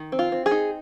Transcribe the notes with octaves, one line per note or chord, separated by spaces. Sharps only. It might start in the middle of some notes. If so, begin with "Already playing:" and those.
Already playing: D#3
C4
F4
C4
G#4
D#4